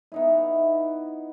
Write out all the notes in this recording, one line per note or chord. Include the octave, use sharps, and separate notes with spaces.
B3 D#4 E4